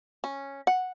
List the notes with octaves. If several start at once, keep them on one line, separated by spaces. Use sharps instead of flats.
C#4
F#5